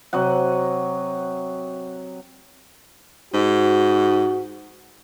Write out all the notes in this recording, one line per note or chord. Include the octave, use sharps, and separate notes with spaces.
C3 F#3 D#5 F#5
G#2 F#4